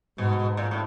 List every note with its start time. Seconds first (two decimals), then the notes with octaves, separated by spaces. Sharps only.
0.18 G#2 B2
0.57 A#2
0.71 A2